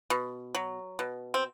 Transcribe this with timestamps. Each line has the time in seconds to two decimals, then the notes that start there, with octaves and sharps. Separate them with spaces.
0.10 B2
0.55 F#3
0.99 B2
1.34 C4